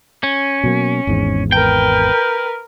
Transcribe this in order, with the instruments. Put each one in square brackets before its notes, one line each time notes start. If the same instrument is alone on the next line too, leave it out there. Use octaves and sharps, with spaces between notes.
[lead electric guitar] C#4
[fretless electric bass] B2 F#3 A#3
G#1 E2 G#2
[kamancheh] A#4 B4 [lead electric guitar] G5